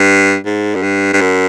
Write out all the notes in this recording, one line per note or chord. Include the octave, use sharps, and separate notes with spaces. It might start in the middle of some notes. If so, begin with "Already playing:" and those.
Already playing: G2
G#2
F#2
G2
G2
F#2